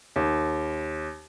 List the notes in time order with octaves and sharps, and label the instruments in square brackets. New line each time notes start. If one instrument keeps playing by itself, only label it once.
[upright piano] D#2